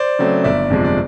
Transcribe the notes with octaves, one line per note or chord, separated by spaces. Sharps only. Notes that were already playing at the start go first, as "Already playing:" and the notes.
Already playing: C5 D5
C#3 F#3 A3 C4
G1 D5 E5
F2 C3 F3 G#3
D5